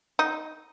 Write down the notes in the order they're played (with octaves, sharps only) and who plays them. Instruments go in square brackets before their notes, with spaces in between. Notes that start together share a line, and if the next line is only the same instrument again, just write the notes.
[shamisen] D#4